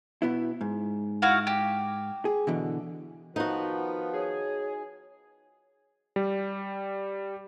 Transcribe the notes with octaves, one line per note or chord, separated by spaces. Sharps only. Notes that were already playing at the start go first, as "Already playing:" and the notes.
B2 B3 E4
G#2
E4 F#4 F5
G4
G#4
B2 D3 E3
D#3 F3 B3 D#4 F#4
G#4 C#5
G3